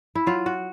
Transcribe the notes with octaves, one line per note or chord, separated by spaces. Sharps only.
E4
F#3 F4
F#4